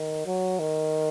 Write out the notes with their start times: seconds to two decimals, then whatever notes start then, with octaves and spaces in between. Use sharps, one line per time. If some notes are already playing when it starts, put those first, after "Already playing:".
Already playing: D#3
0.26 F#3
0.59 D#3